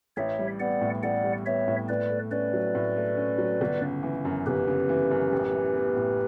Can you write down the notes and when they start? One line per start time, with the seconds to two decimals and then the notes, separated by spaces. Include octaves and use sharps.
0.17 A1 C#5 E5
0.39 G3
0.60 B3 D5 F#5
0.81 A2
1.03 A1 D5 F#5
1.24 G3
1.46 B3 C#5 E5
1.68 A2
1.88 A2 B4 D5
2.10 A3
2.31 C#4 B4 D5
2.53 F#3
2.75 A2
2.97 A3
3.17 C#4
3.38 F#3
3.61 G1
3.81 C#3
4.03 E3
4.25 F#2
4.46 G1 G4 B4
4.68 C#3
4.89 E3
5.11 F#2
5.33 A1
5.54 E3
5.75 B3
5.96 A2